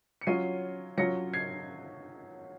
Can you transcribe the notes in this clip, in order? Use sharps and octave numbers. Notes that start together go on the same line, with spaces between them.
C#7
F#3 C#4 F4 C7 D#7
F#3 C#4 F4 A#6 C#7
G#6 C7